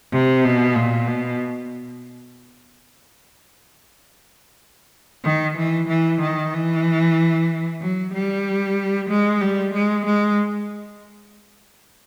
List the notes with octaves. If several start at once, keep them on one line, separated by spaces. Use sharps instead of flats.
C3
B2
A#2
B2
D#3
E3
E3
D#3
E3
F#3
G3
G#3
G3
G#3
G#3